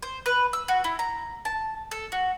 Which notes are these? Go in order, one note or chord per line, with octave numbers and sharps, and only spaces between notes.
C5
B4
E6
F#4
E4
A#5
A5
A4
F#4